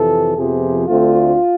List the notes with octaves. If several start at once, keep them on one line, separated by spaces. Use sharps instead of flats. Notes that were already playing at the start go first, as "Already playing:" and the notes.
Already playing: F2 C3 E3 A4
F2 C3 F3 B3 G#4
D2 D3 A3 C4 F4